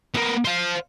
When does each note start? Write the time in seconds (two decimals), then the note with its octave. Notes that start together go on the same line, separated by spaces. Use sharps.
0.14 B3 A#4
0.45 C5 F5